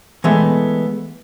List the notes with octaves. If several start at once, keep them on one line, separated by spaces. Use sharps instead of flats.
E3 G#3 A3 B3